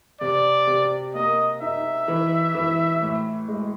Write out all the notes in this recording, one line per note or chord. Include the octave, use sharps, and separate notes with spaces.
C3 D5
C3
A#3 D#5
D#4 E5
E3
E3
A2
G#3